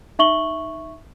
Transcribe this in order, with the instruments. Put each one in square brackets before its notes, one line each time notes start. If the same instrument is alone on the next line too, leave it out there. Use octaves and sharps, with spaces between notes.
[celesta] D#4 E5 C#6 F#7 G7